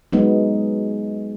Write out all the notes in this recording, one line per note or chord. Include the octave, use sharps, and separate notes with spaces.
F#3 G#3 B3 D#4